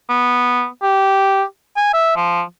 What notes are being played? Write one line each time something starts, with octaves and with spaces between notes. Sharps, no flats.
B3
G4
G#5
E5
F3